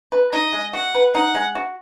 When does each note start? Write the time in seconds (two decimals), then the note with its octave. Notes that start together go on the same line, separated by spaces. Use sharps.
0.12 B4
0.32 D#4 D#5
0.52 G#3
0.73 F#4 F#5
0.95 B4
1.15 D#4 F#5
1.35 G#3
1.55 F#4